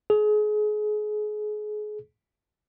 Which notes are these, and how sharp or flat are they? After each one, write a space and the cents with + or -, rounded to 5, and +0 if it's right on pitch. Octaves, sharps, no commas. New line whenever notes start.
G#4 +30